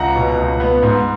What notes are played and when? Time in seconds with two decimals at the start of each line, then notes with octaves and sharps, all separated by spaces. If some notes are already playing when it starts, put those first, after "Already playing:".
Already playing: C#2 F#5 A#5
0.16 B2
0.38 C#2
0.60 B3
0.83 G#2